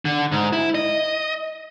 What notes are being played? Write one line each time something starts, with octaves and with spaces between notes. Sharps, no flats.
D3
G#2
E4
D#5